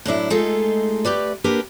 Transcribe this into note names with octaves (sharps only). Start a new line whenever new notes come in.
A2 F#3 D4 E4
G#3 A3 D#4 F4 G#4 A4
A3 G4 B4 D5
A#3 D4 G4 A#4 B4